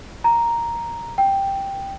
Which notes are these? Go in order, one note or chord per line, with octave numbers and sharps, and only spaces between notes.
A#5
G5